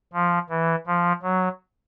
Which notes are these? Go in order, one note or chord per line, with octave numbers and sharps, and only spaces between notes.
F3
E3
F3
F#3